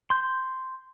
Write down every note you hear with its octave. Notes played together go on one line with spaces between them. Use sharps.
C6 G6